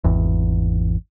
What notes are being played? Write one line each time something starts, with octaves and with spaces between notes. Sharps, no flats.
G#1 E2